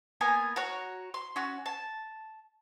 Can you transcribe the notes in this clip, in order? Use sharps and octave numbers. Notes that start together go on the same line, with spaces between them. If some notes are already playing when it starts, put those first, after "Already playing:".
A#3 B3 A#4 G#5
F#4 A#4 C#5
C6
C#4 F#4
A5